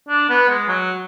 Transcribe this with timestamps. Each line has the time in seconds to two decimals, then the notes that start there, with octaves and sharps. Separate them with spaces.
0.09 D4
0.29 B3
0.49 G#3
0.68 F#3